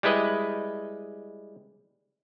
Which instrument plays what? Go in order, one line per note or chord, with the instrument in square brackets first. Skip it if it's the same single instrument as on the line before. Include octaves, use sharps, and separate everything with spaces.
[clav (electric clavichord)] G3 G#3 E4 B4 D#5